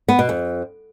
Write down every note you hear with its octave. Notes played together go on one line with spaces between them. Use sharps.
B3
B2
F2